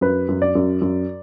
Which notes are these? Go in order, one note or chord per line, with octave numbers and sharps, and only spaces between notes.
F#2 B4
F#2
D5
F#2
F#2